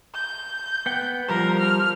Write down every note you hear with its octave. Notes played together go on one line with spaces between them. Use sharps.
G6
B3 F#5 G5
F3 G3 A#4 C5
F6